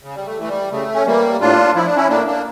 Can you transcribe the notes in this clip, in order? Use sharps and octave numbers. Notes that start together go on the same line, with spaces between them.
C#3
G3
A3
E3 A3
G3
C#3 A3
C#4
E3 G3 A#3
A2 D4 F4
F3 E4
D4
C#4 E4
A2 A#3 D4
A#3 D4